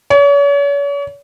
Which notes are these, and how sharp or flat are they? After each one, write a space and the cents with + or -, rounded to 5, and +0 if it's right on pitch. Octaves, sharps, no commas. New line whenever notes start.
C#5 +40